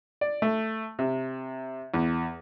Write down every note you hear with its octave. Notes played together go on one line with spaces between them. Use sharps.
D5
A3
C3
E2